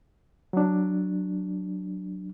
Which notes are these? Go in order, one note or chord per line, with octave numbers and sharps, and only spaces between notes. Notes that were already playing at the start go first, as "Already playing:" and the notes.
F#3 D4